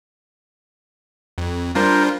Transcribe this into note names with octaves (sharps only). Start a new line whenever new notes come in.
F2
G3 D4 F4 A#4 C5